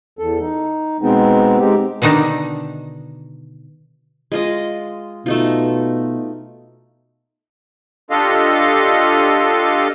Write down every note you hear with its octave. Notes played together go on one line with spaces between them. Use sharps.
E2 A4
D#4
B2 G#3 B3 C4 D#4
G#3 C4 D#4 G4
B2 D3 D#3 D4 D#4
G#3 F4 D#5
B2 A3 D#4 F4
D4 F4 G4 A4 D#5 F5